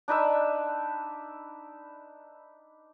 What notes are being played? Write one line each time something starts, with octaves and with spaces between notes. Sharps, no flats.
D4 D#4 B4 E5